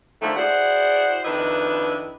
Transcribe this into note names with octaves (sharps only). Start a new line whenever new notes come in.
D3 D#3 F3 A3
E4 F#4 G#4 C5 D5 F#5
F2 D#3 D4 E4 B4 D#5